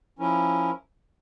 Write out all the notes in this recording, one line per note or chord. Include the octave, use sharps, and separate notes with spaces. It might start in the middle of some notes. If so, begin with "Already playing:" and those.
F3 C#4 E4 A#4